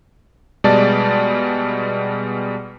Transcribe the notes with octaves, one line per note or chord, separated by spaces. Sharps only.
B2 G3 G#3 D5 A5 A6